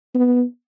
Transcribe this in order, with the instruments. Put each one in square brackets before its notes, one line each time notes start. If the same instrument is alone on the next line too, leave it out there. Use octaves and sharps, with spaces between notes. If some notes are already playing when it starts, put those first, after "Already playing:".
[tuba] B3